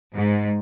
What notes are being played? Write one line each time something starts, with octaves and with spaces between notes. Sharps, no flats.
G#2